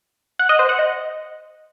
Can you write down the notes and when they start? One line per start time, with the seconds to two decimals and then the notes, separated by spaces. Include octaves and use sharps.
0.39 F#5
0.49 D#5
0.59 C5
0.69 F#5
0.79 D#5